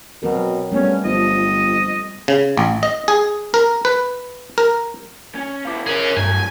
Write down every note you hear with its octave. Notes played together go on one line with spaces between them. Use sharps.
B2 F#3 C4 A#4
G3 A3 B3 C#4
G1 F3 D#5
F2
C#3
A1
D#5
G#4
A#4
B4
A#4
C#4
B2 E4 F5 D6
C#4 G#4 A#4 C#5
G2 F#3 A3 G#5